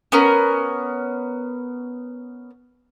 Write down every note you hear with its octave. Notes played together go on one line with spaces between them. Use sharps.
B3 C#4 A#4